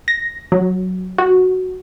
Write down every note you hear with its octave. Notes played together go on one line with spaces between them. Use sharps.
A#6
F#3
F#4